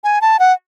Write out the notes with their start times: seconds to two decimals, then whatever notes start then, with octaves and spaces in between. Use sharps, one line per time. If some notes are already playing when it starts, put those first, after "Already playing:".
0.04 G#5
0.21 A5
0.39 F#5